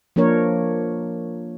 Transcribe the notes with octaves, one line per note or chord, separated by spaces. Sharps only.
F3 A#3 D4 A#4 C#5